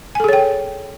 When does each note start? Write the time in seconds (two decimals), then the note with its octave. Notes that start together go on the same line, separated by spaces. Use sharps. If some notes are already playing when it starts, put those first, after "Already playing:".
0.15 G#5
0.20 A4
0.24 G#4
0.29 C#5
0.33 G5